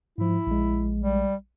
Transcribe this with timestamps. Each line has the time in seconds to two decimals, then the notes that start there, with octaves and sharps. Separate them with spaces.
0.18 G#2 F3 E4
0.47 A#1 G#3
1.00 G3